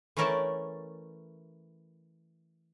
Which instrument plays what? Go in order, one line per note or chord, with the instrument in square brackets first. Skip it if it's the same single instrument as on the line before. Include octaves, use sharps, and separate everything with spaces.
[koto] E3 A3 C#4 A#4 D5 A5